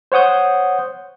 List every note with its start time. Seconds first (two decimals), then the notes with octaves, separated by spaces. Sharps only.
0.12 C5 C#5 F#5 D#6 G6